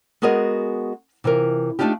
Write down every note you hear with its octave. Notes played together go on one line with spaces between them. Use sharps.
G#3 B3 F#4 G#4 A#4 D#5
C3 E3 F4 A#4
A3 A#3 D4 D#4 F4 G4